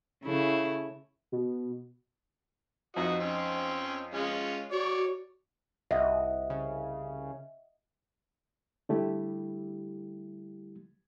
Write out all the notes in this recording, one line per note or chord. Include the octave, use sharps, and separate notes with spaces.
C#3 A3 E4
B2
F2 D#4 F#4 D#5
C4 C#4
G#3 C#4 F4
F#4 C#5 D5
C2 D#5 E5 F#5
C#3
D3 G3 A3 E4 G4